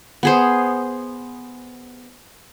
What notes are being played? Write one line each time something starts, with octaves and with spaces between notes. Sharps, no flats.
B3 G#4 C5